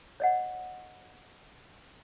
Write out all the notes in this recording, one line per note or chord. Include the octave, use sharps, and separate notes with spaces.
C#5 D#5 F#5